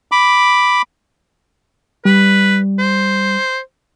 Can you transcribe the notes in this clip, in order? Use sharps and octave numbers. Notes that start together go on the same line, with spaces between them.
B5 D6
G3 B4
C5